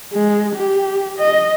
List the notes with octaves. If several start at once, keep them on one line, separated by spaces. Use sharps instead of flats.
G#3
G4
D#5